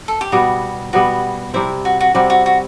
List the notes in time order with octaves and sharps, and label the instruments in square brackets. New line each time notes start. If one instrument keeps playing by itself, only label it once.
[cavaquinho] A4
G4
[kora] B2 G3 B3 [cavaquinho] F#4
[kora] B2 G3 B3 [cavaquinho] F#4
[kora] C3 G3 C4 [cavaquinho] E4
[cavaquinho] F#4
F#4
[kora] C3 G3 C4 [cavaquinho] F#4
[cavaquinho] F#4
F#4